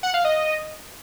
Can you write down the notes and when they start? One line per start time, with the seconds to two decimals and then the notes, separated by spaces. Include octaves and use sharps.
0.03 F#5
0.14 F5
0.24 D#5